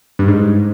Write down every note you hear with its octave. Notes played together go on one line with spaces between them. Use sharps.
G2
G#2